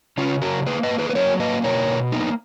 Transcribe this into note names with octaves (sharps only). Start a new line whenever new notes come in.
C#3 C#4 F4
F#3 F#4 A#4
A#3 G#4 B4
B4 D#5
A#3
G#4 B4
B4
F#3 A#4 C#5
A#3 B4 D#5
B2 A#4 C#5
B2
A#3 B3 D#4